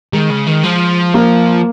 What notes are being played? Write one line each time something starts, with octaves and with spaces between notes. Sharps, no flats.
D#3 G#3
C#3
D#3
F3
A#3